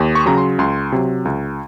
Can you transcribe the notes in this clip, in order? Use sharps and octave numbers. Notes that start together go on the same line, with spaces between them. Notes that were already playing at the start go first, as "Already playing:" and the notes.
Already playing: D#2
C#6
C#3 F#3 A#5
C6
C#2 C6
C3 F#3
C#2